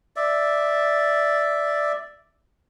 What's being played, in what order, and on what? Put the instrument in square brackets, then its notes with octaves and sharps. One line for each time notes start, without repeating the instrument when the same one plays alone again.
[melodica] D5 E5